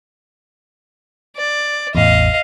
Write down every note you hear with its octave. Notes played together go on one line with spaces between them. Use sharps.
D5
A1 E2 D#5 F5